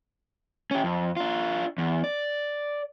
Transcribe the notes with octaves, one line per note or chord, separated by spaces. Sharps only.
C#4 G4
F2
D4 F4
E2
D5